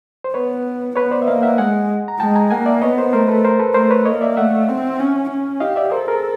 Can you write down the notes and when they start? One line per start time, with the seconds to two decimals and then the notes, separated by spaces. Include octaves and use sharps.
0.24 C5
0.34 B3 B4 C#5
0.96 B3 B4 C#5
1.11 C5 D5
1.22 E5
1.27 A#3 D#5 F5
1.42 E5 F#5
1.58 G#3 F#5 G#5
2.08 A#5
2.19 G#3 G5 A5
2.35 G#5 A#5
2.50 A#3 F#5 G#5
2.66 D5 E5
2.81 B3 C#5 D#5
2.97 A#4 C5
3.13 A3 A#4 C5
3.28 A4 B4
3.45 A#4 C5
3.60 A4 B4
3.74 A3 A#4 C5
3.90 B4 C#5
4.05 A#3 C#5 D#5
4.21 D5 E5
4.30 F5
4.37 A3 E5 F#5
4.68 C4
4.99 C#4
5.30 C#4
5.60 G4 D#5 F5
5.76 D5 E5
5.91 A4 A#4 C5
6.07 G#4 A#4